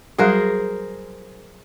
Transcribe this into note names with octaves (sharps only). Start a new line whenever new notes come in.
F#3 G3 F#4 G#4 A#4 C5